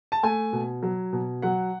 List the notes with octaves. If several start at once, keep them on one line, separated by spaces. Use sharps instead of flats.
A5
A3 G#5
B2
F#3
B2
F#3 F#5